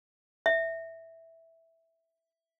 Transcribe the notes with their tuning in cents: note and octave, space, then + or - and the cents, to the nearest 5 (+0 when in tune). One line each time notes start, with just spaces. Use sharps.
E5 -5